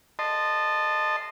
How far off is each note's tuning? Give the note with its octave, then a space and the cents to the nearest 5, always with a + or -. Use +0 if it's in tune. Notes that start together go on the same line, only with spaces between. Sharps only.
D#5 -25 A5 +0 C6 -5